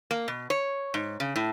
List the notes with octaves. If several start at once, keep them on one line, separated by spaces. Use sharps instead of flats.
A#3
B2
C#5
G#2
C#3
A2